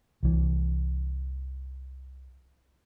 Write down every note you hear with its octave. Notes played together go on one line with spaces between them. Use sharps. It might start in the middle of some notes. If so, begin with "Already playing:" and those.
C2 E3